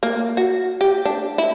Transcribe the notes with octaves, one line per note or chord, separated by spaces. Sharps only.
A#3
F#4
G4
D4
E4